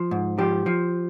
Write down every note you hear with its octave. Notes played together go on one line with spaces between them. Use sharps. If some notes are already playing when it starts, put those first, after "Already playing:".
Already playing: F3
G#2
F3 G4
F3